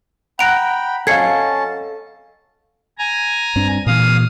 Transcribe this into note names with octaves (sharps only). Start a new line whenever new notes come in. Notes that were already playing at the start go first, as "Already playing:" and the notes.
F#5 G5 A#5 B5 F#6 A#6 D7 F7
C#4 A4 D#5 F5 A5 G#6 C7 C#7
G#5 A#5
G2 C4 D4
A#2 E3 F5 D#6